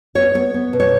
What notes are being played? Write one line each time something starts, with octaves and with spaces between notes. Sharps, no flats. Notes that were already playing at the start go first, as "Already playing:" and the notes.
B3 C#5
B3 C#5
B3
B2
C#5